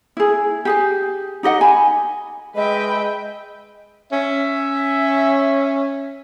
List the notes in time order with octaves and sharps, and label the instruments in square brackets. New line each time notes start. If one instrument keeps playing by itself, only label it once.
[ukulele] E4 G#4
G4 G#4 G#5
D#4 G4 D#5 F#5
G#5 B5
[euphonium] G#3 [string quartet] B4 E5 G5 [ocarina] D#5
[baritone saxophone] C#4 [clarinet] E5